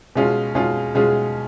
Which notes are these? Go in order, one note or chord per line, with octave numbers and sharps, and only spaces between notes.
B2 G#3 C#4 F4 G#4
B2 G#3 C#4 F4 G#4
B2 G#3 C#4 F4 G#4